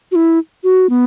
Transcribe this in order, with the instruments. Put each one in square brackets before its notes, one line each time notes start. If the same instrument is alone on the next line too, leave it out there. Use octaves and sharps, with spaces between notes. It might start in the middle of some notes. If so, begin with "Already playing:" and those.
[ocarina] F#4
E4
F#4
B3